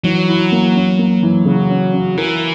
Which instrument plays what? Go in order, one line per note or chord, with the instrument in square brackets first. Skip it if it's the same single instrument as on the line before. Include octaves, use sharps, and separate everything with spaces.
[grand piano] E3 [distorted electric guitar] F#3
[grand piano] E4
A#3
C#4
A#3
E3
C#3
C#4
C#4
[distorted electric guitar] E3 [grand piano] A#4